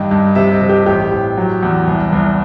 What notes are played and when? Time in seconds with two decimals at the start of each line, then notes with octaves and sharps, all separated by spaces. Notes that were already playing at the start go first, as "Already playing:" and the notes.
Already playing: G2 D#3 D#5
0.11 G2
0.35 C3 E5
0.53 D#5
0.62 C3
0.69 G4
0.86 A1 G4
1.11 A1
1.37 F#3
1.63 E2
1.87 C2
2.12 C2